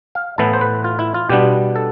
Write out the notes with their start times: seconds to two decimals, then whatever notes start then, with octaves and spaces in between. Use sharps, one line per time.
0.15 F5
0.38 A2 E3 B3 E4 A5
0.54 C5
0.61 B4
0.84 F4
0.99 E4
1.14 F4
1.30 B2 G3 B3 D4 G4
1.76 A4